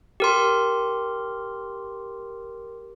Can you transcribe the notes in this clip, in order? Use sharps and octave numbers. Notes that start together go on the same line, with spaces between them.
G4 A#4 C6